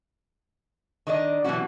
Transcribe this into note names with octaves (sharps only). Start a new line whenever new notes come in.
D#3 D4 D5 D#5
B2 E3 F#3 G3 C#4 F#4